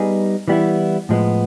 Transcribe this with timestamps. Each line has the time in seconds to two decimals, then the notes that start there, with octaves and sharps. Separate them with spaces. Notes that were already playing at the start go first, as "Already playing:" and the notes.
Already playing: G3 B3 D#4 G#4
0.48 E3 G3 B3 E4
1.09 A2 F3 G#3 B3